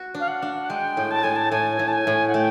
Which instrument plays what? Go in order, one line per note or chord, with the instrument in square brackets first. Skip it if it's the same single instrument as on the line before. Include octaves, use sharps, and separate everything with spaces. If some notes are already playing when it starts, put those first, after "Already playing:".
Already playing: [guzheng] F#4
D4
[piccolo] F5
F#5
[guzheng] D4
[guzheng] G#3 [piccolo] G5
[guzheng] A2
[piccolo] A5
[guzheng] A2 [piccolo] G#5
[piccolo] A5
[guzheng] A2 [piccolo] G#5
[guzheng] A2
[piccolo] A5
G#5
[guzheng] A2
[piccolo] F#5
[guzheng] A3 [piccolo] G5